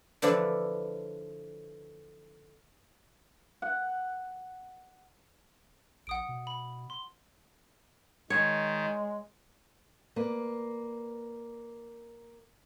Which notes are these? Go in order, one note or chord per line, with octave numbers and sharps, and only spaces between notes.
D3 E3 F3 D4 B4 D5
F#5
A#1 F#5 D#6 D7
B2
B5
C6
D#3 G#3 C#5
A#3 B4 D5